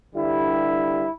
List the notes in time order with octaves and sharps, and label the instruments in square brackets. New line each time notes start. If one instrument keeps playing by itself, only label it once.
[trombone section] G2 D3 G3 E4